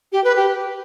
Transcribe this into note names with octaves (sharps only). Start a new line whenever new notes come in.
G4
B4
G4